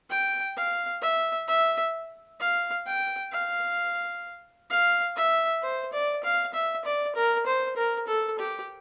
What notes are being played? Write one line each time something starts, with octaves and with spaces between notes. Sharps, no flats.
G5
F5
E5
E5
F5
G5
F5
F5
E5
C5
D5
F5
E5
D5
A#4
C5
A#4
A4
G4